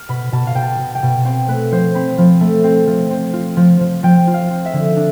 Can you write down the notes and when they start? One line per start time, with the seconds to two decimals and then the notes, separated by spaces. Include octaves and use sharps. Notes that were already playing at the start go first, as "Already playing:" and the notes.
Already playing: F6
0.09 B2 B5
0.32 B2 A5
0.47 F5
0.55 B2 G5
0.63 A5
0.79 B2
0.95 G5
1.03 B2
1.25 C4 G5
1.48 A3 B4
1.72 F3 C5
1.95 C4 B5
2.18 F3
2.41 A3
2.64 C4
2.87 F3
3.10 C4
3.33 F4
3.57 F3
3.80 F3
4.03 F3 G5
4.27 F4
4.34 F5
4.50 C4
4.65 E5
4.73 D3
4.96 D4